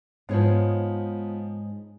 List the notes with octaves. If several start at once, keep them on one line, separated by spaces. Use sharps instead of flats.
G#2 F3 B3 C#5